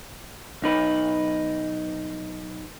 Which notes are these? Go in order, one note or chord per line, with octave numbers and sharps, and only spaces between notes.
B1 D#4 B4